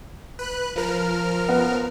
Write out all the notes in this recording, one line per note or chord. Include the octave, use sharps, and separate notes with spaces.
B4 F#6
F3 A#4 F6
B3